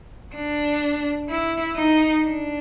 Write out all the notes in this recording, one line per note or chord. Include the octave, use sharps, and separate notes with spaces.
D4
E4
D#4
D4